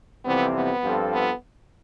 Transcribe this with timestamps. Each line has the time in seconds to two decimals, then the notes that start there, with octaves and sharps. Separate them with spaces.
0.25 F2 C3 E3 G3 B3 C4
0.54 B3
0.83 G2 F3 C4 F4 A4
1.13 B3